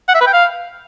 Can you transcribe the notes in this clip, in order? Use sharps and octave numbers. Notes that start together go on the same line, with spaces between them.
F#5
E5
B4
G5
F5